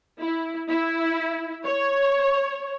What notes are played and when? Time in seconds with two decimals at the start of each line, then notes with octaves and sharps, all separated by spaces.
0.20 E4
0.70 E4
1.66 C#5